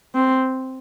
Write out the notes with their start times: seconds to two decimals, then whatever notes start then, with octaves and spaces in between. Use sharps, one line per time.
0.15 C4